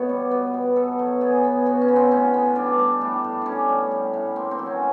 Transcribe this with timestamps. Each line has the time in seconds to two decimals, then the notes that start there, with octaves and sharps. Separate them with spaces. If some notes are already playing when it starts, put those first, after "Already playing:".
Already playing: B2 B3 C#5
0.09 G3
0.31 B3
0.54 B2
0.76 B3 A4
0.99 F#3
1.21 B3 G#4
1.44 B3
1.66 B3 F#4
1.81 C#4
1.88 B3
1.96 C4
2.11 A2 C#4
2.34 B3
2.56 G3 D4
2.79 G3
3.01 A2 D4
3.24 A2
3.42 G3 C#4 D4
3.68 G3
3.91 A2
4.14 A2
4.36 A#3 C4
4.51 C4
4.59 F#3
4.66 C#4